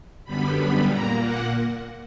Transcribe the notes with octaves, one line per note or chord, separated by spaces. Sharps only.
F#2 D3 G3 B3 B5
B5
A#2 A#3 A#5
F#5